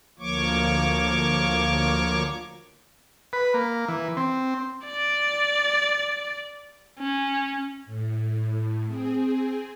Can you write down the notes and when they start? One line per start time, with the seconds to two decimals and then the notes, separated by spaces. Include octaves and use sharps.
0.19 D2 F3 A#3 C#5 C#6 D6
3.33 B4
3.54 A#3
3.88 E3
4.17 C4
4.86 D5
7.00 C#4
7.86 A2
8.87 C4 G#4